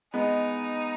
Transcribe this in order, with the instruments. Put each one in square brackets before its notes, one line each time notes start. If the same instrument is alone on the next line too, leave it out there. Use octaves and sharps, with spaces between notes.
[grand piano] G#3 B3 [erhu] D#4